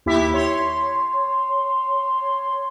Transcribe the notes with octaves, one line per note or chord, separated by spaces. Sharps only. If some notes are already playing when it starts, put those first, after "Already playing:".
D#2 E4 G4 E5 B6
C#5 C6